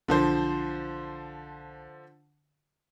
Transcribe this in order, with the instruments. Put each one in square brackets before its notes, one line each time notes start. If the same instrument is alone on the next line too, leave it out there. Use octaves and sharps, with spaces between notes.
[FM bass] B1 [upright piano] D3 F3 C5